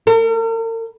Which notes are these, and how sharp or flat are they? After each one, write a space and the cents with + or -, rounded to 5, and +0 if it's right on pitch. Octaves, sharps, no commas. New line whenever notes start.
A#4 -45